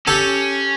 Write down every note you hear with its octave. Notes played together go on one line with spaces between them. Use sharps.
C#4 G4 A4